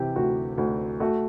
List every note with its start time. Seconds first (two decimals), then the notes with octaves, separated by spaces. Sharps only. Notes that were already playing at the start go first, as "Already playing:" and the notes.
Already playing: C3 E3 G4
0.16 D2 F#4
0.58 D2
1.00 A3 F#4